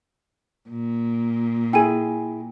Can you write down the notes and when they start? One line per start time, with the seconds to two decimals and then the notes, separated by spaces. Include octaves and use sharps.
0.70 A#2
1.73 E4 G#4 G5 G#5 D#7